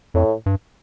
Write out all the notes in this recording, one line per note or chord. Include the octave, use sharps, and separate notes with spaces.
F2 A2
G2